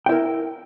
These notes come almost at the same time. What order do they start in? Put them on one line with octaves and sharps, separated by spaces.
G5 E4 A#4